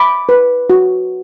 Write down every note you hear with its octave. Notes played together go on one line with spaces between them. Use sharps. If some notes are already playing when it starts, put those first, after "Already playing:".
Already playing: B5 D6
B4
F#4